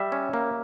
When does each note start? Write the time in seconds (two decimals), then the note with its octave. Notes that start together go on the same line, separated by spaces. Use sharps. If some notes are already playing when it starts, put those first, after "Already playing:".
Already playing: G3 E5
0.12 C#4
0.33 A#3